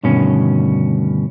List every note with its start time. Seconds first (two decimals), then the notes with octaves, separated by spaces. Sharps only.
0.03 D2 G2 B2 D#3 C#4